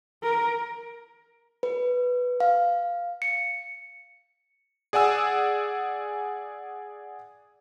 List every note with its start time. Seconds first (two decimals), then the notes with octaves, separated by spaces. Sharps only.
0.23 A#4
1.63 B4
2.40 F5
3.22 C#7
4.93 G#4 D5 F#5 G#5 E6